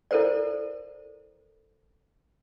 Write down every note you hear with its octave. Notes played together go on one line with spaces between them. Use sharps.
E4 A4 A#4 C5 D5